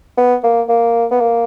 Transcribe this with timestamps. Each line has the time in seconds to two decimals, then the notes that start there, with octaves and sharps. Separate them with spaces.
0.17 B3
0.44 A#3
0.69 A#3
1.11 B3
1.20 A#3